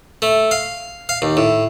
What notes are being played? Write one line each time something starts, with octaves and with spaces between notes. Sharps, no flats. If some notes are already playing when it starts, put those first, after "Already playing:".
A3
F5
F5
D#2
A2